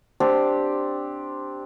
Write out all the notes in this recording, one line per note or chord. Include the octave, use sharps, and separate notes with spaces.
C4 D4 G4